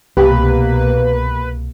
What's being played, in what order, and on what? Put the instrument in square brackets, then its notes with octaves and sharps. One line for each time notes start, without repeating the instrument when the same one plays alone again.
[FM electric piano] C2 [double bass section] B2 A#3 [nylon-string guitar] G4 [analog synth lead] B4